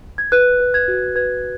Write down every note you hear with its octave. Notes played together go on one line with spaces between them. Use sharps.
G#6
B4 F#6
B4
G#6
F#4
B4 G#6